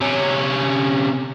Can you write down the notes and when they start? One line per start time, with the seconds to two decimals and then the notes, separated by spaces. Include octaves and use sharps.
0.01 C3 C#4